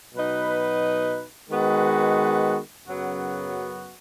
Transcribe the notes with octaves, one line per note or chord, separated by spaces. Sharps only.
B2 F#3 D#4 B4
D#3 G#3 B3 F#4 B4
F#2 C#3 F#3 B3 F#4